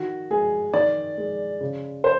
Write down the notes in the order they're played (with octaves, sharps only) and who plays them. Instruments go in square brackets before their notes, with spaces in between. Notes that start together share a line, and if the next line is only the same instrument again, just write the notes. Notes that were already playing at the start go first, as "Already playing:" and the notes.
Already playing: [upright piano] D#3 F#4
G#3 G#4
D#3 D5
G#3
C#3
C5